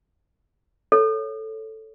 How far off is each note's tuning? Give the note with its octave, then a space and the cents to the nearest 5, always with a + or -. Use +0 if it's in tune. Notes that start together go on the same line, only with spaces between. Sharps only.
A4 +0 C#5 +0